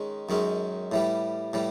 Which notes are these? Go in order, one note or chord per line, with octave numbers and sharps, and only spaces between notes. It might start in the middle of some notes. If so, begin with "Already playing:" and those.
Already playing: D#3 G#3 C#4
F#2 D#3 G#3 C#4
A2 E3 G3
A2 E3 G3